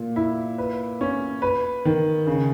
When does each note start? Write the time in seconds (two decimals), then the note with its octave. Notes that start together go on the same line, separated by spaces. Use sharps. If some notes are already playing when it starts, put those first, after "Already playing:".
Already playing: A#2
0.16 E4
0.58 B4
1.01 C#4
1.42 B4
1.85 D#3
2.27 C#3